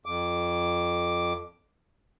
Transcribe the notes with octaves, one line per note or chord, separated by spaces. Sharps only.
F2 D6